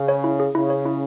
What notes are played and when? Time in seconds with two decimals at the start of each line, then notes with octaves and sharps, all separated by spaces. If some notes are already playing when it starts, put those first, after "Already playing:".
Already playing: C#3
0.08 C#5
0.24 E4
0.40 G#4
0.54 C#3 E4
0.70 C#5
0.85 E4